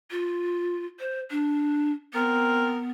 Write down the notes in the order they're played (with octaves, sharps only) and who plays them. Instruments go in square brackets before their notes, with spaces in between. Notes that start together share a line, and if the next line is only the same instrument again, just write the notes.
[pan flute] F4
C5
D4
[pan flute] B3 [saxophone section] C4 A#4